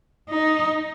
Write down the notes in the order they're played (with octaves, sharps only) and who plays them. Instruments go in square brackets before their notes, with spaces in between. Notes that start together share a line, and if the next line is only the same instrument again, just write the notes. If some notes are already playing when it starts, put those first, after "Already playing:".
[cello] D#4